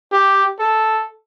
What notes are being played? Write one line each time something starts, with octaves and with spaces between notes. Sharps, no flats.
G4
A4